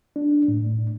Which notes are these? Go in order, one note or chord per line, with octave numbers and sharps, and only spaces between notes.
D4
A2